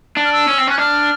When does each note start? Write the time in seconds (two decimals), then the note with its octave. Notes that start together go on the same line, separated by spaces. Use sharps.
0.17 D4
0.25 F6
0.33 E6
0.48 C#4
0.58 C4
0.68 C#4 F#6
0.78 D4 F6